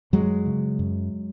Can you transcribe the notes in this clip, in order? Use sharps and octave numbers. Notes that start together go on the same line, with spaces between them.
F#2 F#3 G#3
C#3
F#2